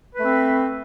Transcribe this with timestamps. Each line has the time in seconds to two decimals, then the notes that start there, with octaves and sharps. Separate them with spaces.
0.14 B4
0.19 A3
0.24 C4